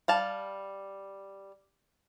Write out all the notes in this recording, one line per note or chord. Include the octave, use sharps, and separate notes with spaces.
G3 F5 A5